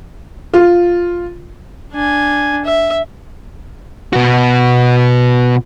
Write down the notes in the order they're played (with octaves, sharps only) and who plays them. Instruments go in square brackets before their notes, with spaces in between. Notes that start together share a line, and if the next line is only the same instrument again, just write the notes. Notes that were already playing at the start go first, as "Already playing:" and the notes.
[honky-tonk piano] F4
[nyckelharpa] D4 G#5
E5
[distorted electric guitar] B2 F#4